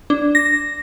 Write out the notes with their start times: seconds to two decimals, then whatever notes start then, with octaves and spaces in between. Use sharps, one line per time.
0.10 D4
0.35 A#6